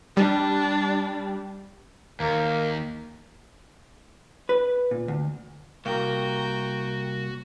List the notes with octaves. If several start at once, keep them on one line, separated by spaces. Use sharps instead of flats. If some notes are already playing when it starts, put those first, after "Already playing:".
G3 D4
D#2 A#3
B4
A#2
D2
C2 A#3 F#4 G5 A#5